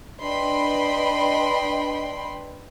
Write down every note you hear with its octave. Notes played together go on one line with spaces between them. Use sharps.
D4 B4 D#5 G5 B5 C6